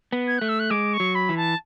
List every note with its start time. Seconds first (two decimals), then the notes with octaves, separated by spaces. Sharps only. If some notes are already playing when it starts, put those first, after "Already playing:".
0.12 B3
0.27 G#6
0.38 A3 F#6
0.48 E6
0.59 F#6
0.70 G#3 D6
0.93 C#6
1.00 F#3
1.14 B5
1.29 E3
1.36 A5